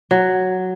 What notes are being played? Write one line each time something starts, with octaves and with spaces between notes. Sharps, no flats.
F#3